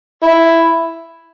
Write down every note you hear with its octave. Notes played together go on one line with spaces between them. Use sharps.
E4